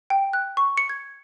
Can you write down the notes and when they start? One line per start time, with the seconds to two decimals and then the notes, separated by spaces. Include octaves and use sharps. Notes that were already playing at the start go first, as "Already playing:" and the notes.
0.10 G5
0.33 F#6
0.57 C#6
0.77 C#7
0.89 G#6